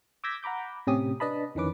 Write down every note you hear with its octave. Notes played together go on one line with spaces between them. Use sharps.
D6 E6 G6 G#6 A#6 B6
F#5 A#5 B5 D6 G6
A2 C3 C#4 G4 D#6
D4 B4 D#5 A5 B5
F2 D#3 E3 C#4 B4 D6